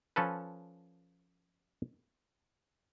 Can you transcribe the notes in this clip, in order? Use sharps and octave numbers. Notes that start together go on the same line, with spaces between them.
F3 C#4 A4 B4